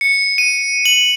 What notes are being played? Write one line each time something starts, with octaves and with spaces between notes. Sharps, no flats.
C#7
D#7
F#7